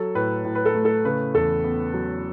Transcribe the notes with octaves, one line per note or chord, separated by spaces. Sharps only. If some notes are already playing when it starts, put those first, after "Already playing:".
Already playing: F#3 A4
A2 B4
A2
B4
A4
A3
A4
C#3 B4
E2 A4
B3
F#3